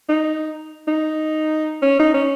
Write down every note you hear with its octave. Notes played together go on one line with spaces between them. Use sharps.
D#4
D#4
C#4
D#4
C#4